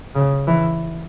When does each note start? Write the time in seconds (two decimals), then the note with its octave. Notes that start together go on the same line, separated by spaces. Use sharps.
0.15 C#3
0.48 E3